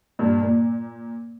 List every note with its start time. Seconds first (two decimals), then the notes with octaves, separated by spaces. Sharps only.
0.19 G2 A#2
0.43 A#2